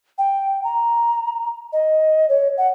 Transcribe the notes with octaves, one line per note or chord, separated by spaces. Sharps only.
G5
A#5
D#5
C#5
F#5